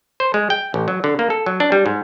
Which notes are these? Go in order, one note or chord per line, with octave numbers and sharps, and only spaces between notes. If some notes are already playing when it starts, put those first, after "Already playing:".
C5
G#3
G5
A1
F#3
D3
A#3
A4
F#3
D4
G3
G#2